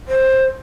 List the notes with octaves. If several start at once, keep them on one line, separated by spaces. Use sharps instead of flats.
C5